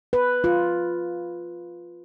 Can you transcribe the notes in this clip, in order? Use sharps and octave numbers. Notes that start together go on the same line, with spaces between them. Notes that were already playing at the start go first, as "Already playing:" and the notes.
B4
F4